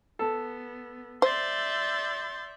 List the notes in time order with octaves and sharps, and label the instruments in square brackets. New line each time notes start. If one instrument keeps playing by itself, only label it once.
[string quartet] B3 [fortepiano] A4
[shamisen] C5 [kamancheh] D5 E5 [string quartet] C6 G6 A6